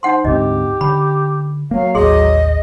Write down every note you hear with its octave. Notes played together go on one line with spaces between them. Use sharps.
D#4 C5 F#5 C6
D2 G#2 C4 G4 D#5
D3 B5
F#3 A#3 F5
A1 D#2 G#4 D#5 C6